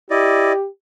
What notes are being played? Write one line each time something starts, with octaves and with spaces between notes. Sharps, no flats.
E4 G4 D5 D#5